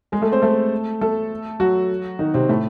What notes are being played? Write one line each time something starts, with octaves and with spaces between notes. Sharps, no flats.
G#3 G#4
A3 A4
C4 C5
A3 A4
A3 A4
F#3 F#4
D#3 D#4
C3 C4
A2 A3